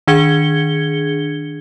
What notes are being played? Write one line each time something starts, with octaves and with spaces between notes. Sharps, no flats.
D#3 D4 G#4 G#6 C#7 G7